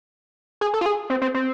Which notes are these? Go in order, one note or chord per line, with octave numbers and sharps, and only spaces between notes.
G#4
A4
F4
G#4
C4
C4
C4